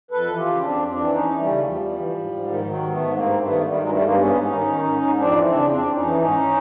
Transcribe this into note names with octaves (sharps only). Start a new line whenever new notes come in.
F2 A4 B4
E3
F4 G4
C#3
F2 C4 D4
F2
C4 D4
E3
E2 C#4 D#4
E3
G3 A3
C#3
E2 F3 G3
E2
E3
G#2
G#2
D#3
D#3 F#3
G#2
A3 B3
G#2
G2 A#3 C4
G2
A3 B3
D#3
D#3 G3 A3
G2 F#3 G#3
G3 A3
G2 G#3 A#3
G#2 B3 C#4
G#2
C#4 D#4
D#3
D#3
G#2
G#2
F2 C4 D4
E3
C4 D4
C#3
F2 C4 D4
F2
C#4 D#4
E3
G#2 C#4 D#4